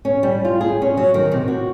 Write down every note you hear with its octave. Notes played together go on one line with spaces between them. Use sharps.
C#4
G3
F4
G#4
C#4
F#3
D#3
C3
F#4